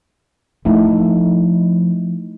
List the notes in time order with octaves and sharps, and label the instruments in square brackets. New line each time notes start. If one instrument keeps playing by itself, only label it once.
[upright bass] F3 [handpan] A3 D#4 E4